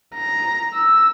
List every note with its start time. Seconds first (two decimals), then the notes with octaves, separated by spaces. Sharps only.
0.15 A#5
0.73 E6